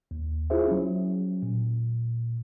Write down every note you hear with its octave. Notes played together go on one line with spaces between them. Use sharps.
D#2
E4 F4 G#4 C5 E5
F#3 C#4
A#2